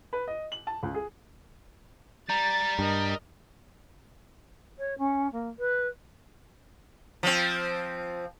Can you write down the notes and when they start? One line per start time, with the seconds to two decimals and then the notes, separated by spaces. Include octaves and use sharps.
0.13 B4
0.28 D#5
0.52 F#7
0.67 A5
0.83 C#2
0.94 G#4
2.30 G3 A#5 A6
2.79 G2 A#4 D#5
4.78 C#5
4.98 C#4
5.32 A#3
5.58 B4
7.23 F3 C4